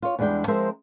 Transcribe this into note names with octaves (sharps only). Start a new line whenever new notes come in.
F4 C#5
E2 G3 G#3 D4 E5 G5
F3 G#3 C4 A#4 C5 E5